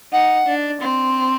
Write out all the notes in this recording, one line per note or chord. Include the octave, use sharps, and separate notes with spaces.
D#4 F#5
D4
C4